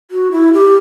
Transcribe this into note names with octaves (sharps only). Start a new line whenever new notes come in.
F#4
E4
G4